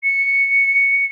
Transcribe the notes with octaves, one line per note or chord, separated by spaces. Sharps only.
C#7